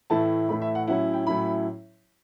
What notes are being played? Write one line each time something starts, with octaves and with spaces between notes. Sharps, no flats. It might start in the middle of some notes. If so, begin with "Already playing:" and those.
A2 E3 A3 E4 A5
A2 E3 A3 E4 B5
E5
F#5
A2 F#3 C#4 E4 F#5
G5
A2 F#3 C#4 E4 B5